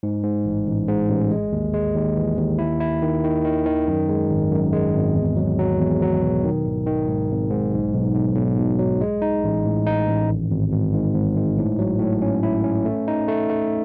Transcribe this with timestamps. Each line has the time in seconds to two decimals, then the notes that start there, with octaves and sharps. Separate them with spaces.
0.03 G#2
0.24 G#2
0.45 A1
0.66 A1
0.88 G#2
1.09 A1
1.31 G#3
1.52 D#2
1.74 G#3
1.95 D#2
2.16 E3
2.38 D#2
2.59 E4
2.81 E4
3.02 D#3
3.24 D#3
3.45 D#3
3.66 D#3
3.88 F#2
4.09 G#3
4.30 G#1
4.52 F#2
4.73 G#3
4.94 G#1
5.15 E2
5.37 F#3
5.59 F#3
5.80 E2
6.02 F#3
6.22 B2
6.44 D#3
6.66 G#1
6.86 D#3
7.08 G#2
7.30 G#1
7.51 G#2
7.73 B1
7.94 B1
8.15 B1
8.36 B1
8.58 B2
8.79 F#3
9.01 G#3
9.22 D#4
9.44 A1
9.65 A2
9.87 D#4
10.08 A1
10.29 G#1
10.50 G#1
10.72 G#1
10.94 G#2
11.15 G#1
11.36 G#2
11.58 A2
11.79 F#3
12.00 A2
12.22 C#4
12.43 E4
12.64 C#4
12.85 A3
13.08 D#4
13.28 A3
13.50 A3